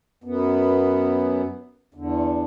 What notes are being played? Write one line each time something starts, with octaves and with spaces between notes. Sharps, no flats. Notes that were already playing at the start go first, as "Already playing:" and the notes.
F#2 B3
E2 D3